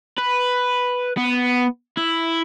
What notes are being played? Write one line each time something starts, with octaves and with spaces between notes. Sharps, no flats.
B4
B3
E4